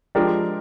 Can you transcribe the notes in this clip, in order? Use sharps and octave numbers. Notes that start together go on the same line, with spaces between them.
F3 G#3 D4 G4 A#4